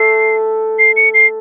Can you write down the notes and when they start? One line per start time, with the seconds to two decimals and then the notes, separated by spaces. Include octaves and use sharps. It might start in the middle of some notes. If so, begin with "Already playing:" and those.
Already playing: A3 C7
0.79 C7
0.97 C#7
1.14 C7